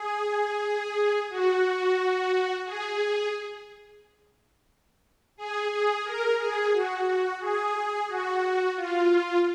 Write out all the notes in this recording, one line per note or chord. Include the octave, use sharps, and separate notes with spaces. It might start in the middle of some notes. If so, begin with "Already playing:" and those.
Already playing: G#4
F#4
G#4
G#4
G#4
A#4
G#4
F#4
G#4
F#4
F4